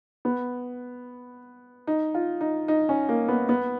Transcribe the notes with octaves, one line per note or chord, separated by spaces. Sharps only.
B3
D#4
F4
D#4
D#4
C#4
A#3
B3
B3